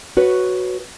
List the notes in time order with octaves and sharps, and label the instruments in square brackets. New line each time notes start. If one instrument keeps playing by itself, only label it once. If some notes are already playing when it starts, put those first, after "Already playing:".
[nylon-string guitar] F#4 B4 C#5